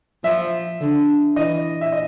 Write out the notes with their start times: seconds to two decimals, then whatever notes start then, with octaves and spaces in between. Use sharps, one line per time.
0.24 F3 E5
0.81 D3
1.36 E3 D#5
1.81 E5
1.92 D#5